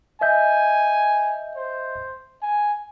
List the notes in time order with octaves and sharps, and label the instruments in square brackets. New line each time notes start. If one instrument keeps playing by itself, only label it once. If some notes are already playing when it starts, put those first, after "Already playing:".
[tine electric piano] D#5 E5 G6 [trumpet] G#5
[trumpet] C5
G#5